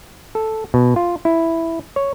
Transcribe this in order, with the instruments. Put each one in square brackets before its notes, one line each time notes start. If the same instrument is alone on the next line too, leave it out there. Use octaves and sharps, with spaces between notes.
[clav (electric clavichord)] A4
B2
F4
E4
C#5